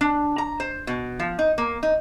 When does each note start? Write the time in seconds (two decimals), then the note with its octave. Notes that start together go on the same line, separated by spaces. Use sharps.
0.01 D4
0.38 A#5
0.60 C5
0.87 B2
1.20 F3
1.39 D#4
1.58 A#3
1.83 D#4